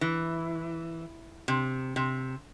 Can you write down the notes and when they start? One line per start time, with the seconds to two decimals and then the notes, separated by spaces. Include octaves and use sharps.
0.01 E3
1.48 C3
1.96 C3